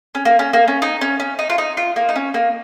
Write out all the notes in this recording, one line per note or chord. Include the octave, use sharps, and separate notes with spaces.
C#4
A#3
C#4
A#3
C#4
D#4
C#4
C#4
D#4
F4
D#4
F4
A#3
D#4
C#4
A#3